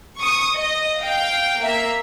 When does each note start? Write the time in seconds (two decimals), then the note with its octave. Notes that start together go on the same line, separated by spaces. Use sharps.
0.19 C#6 D#6
0.55 D#5
1.02 F5 G5
1.60 A#3 E5